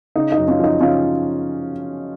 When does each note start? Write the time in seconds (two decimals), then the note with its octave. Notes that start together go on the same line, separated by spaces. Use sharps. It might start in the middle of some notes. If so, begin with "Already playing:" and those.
0.16 C#3 D#4
0.32 D#4
0.38 F#2
0.48 C#4 F4
0.59 F3 D#4
0.80 C#3 C#4 F4